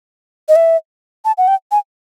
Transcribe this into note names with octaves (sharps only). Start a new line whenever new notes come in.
D#5
E5
A5
F#5
G5
G#5